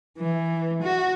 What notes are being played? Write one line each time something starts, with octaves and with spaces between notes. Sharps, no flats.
E3
F#4